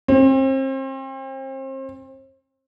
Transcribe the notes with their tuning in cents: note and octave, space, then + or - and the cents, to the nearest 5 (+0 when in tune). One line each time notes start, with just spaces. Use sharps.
C4 +35